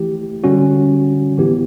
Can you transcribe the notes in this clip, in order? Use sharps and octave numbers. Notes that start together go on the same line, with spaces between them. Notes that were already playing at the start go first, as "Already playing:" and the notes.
Already playing: E3 A3 E4 G4
D3 G3 C#4 F#4
A2 E3 B3 E4 G4